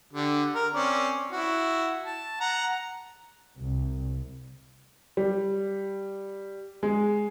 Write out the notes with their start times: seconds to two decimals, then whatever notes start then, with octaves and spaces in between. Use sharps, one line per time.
0.13 D3 G4
0.55 A#4
0.74 C4 C#4 D5
1.32 E4 F#4
2.05 A5
2.41 F#5 A#5
3.59 C2
5.17 G3
6.83 G#3